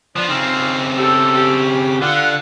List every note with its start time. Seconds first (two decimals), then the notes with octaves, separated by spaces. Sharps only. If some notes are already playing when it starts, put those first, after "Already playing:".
0.16 F3 B3 D4
0.28 C#3 C4 D#4 F4
0.97 G3 G4 A4
1.35 C#4 G4
2.01 D3 G3 F4 F#5